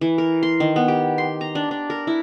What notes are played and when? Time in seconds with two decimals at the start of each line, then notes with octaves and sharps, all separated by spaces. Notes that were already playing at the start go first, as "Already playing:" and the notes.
0.01 E3
0.18 A#4
0.43 C6
0.60 D#3
0.76 B3
0.88 G4
1.18 C6
1.41 A#5
1.55 D4
1.71 D4
1.90 A#4
2.07 E4